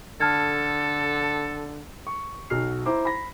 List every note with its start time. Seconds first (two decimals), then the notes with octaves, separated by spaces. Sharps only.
0.21 D3 A4 A5 F6 G#6
2.07 C#6
2.50 B1 F#4 F6 C7
2.86 E4 C5 A#5 D6
3.05 B5 A#6